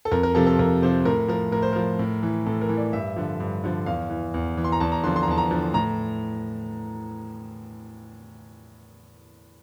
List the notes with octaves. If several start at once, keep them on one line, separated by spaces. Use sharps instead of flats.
A4
F2 A#4
A#4
C3 F3 A4
A4
F2 A#4
C3 F3 C5
A2 A#4
F3 A#4
A2 A#4
C5
F3 A#4
A2
E3
A2 A4
A#4
E3
D5
G2 E5
D3 F3
G2
D3 F3
E2 F5
E3
E2
E3
C6
A#5
E2 A5
A#5
D3 F3 C6
C6
A#5
E2 A5
A#5
D3 F3
A2 A#5